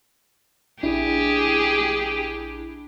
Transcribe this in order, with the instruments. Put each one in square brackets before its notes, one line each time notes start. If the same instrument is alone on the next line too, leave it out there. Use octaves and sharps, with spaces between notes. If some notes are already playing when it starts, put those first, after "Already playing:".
[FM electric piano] A#1 D4 E4 [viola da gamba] G4 G#4